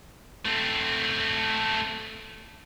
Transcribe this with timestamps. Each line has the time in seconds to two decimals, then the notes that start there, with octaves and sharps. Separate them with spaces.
0.45 A3 C4